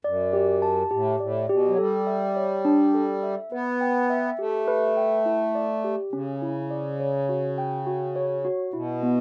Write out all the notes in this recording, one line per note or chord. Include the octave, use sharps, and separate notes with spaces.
F#2 D5
G4
A5
A2 G4
A2 D5
B2 G4
F#3
G3 A4
E5
C#5
D4
A4
E5
B3 B4
G5
E5
A3 G4
B4
G5
E4
D5
G4
C#3 C#4
E4
D5
C#5
F#4
G5
F#4
C#5
F#4
B2 E4
B3